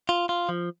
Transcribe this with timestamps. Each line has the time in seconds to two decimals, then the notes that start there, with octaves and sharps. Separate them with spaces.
0.09 F4
0.29 F4
0.49 F3